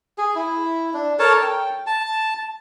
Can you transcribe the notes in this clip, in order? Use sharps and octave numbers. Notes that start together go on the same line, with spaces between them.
G#4
E4
D4
A4 A#4 C#5 A5
G5
A5